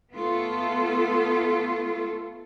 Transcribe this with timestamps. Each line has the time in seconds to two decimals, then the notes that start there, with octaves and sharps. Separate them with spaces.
0.14 A3 B3 F4 A4